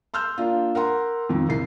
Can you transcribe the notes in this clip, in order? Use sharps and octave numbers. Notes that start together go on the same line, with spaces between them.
C6 E6 F6 G6
A#3 D4 F4
A#4 F#5 C6
F2 D#3
F#1 C2 C7